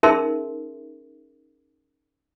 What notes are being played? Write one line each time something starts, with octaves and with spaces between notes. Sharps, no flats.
C#4 D#4 G#4 A#4 E5 C6